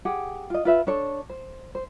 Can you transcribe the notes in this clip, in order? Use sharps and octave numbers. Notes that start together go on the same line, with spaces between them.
G4 G#4 F#5
F4 D#5
F4 B4 E5
D4 A4 C#5
C5
C5